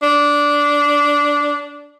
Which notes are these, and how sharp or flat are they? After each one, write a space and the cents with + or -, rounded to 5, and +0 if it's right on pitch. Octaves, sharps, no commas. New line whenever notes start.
D4 -10